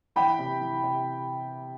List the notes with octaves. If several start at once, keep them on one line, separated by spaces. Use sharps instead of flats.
E3 G5 B5
C3
E3
C3